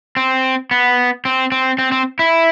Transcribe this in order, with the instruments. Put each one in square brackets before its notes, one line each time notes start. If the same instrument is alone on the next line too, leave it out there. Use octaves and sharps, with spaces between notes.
[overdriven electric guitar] C4
B3
C4
C4
C4
C4
E4